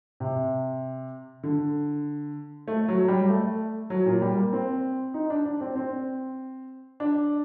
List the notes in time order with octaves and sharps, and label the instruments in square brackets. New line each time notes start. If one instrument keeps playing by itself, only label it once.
[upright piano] C3
D3
A3
F#3
G3
A3
F#3
A#2
G3
A#3
C4
D#4
D4
D4
C4
C4
D4